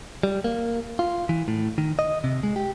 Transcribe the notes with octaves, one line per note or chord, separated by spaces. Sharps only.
G3
A#3
F4
E3
A2
D#3
D#5
C3
G#3
G4